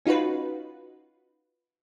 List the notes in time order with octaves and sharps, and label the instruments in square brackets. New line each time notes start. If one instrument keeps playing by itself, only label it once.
[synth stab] C#4 D#4 F4 F#4 B4